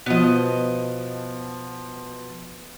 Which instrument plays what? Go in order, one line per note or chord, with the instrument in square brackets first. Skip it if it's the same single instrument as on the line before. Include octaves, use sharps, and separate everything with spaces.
[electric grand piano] B2 F3 [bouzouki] B3 D#5